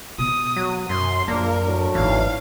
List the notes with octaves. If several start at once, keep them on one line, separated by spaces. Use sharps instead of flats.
B2 B3 D#6
F#3
F#2 C6
A#1 F#2 A#3 D4 A#4
A2 F#3 D4
G#1 E2 E3 F5